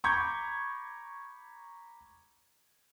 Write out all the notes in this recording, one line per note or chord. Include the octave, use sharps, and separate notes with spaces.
A#5 B5 C#6 D6 G6 G#6